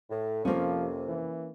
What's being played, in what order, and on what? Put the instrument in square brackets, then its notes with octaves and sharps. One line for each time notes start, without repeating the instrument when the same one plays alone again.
[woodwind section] A2
[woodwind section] F2 C3 [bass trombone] F3 [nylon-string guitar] A#3 C#4
[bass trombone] E3